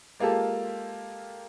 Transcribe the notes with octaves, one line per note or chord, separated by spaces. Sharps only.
G#3 A#3 F4 G4 A4